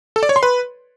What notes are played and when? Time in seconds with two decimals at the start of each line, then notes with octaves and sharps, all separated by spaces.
0.16 A4
0.23 D5
0.29 C#5
0.36 C6
0.43 B4